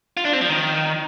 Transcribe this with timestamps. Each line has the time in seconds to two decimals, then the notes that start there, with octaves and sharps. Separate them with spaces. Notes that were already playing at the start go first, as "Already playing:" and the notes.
0.17 F4
0.25 D4
0.33 C4
0.41 F3
0.49 D#3